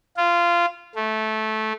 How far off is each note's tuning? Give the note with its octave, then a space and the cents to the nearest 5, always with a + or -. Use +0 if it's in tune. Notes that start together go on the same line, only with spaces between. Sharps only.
F4 -20
A3 -15